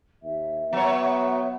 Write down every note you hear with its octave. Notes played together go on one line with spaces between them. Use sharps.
D#2 E5
F#3 B3 C#5